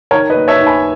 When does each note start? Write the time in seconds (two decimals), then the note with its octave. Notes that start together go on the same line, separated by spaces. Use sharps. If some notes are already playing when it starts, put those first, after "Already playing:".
0.11 D#3 A#4 C#5
0.30 B4 D#5
0.36 A#3
0.48 C#5 E5
0.60 D#2
0.66 G#5 B5